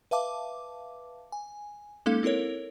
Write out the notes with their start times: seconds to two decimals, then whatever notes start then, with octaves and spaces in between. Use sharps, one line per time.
0.11 B4 E5 F5 A5 D6
1.32 G#5
2.06 G#3 A#3 C#4 D#4 A4 F5
2.23 C4 E4 A4 A#4 C#5